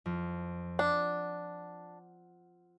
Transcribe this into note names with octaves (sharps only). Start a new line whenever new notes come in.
F2
D4 F#5